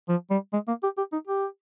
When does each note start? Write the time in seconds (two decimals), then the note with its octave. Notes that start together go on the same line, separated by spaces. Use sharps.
0.09 F3
0.31 G3
0.53 G#3
0.68 A#3
0.83 G4
0.98 G4
1.13 D#4
1.27 G4